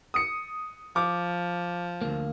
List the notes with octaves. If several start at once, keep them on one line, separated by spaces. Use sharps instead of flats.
D#6 C#7
F3 D6
D2 A#3